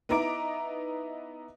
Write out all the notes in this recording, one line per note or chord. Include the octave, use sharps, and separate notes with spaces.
B3 D#4 E4 A#5 D6 D7